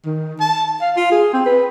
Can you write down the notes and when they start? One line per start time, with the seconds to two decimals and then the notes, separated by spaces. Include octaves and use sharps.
0.06 D#3
0.40 A5
0.81 F5
0.97 F4
1.12 G#4
1.33 C4
1.46 B4